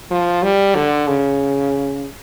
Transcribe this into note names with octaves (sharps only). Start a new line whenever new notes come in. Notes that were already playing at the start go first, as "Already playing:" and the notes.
F3
G3
D3
C#3